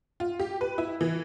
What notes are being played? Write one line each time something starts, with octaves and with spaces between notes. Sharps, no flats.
F4
G4
B4
E4
E3